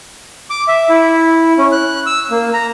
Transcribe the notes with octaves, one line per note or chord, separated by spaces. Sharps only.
D6
E5
E4
C#4
F#6
E6
A#3
A#5